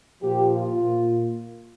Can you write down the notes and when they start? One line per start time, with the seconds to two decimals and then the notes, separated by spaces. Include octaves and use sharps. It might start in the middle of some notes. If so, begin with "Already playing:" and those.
0.23 A#2 F3 G4
0.53 F4
0.83 A#2